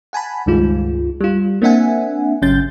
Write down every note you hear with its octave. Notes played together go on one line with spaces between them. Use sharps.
F#5 G#5 A5 B5
C#2 G2 D#3 G#3 F4
G3 F4
A#3 C4 D4 E5 F#5 G#5
G#1 C#3 F#3 C#4 G6 A6